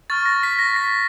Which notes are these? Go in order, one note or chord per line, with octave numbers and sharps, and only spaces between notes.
C#6 F6 A6
A#6
B6
A#6
B6